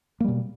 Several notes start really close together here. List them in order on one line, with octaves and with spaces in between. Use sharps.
A#3 G3 B2